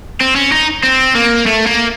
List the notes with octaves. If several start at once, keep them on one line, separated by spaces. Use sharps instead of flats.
C4
C#4
D#4
C4
A#3
A3
A#3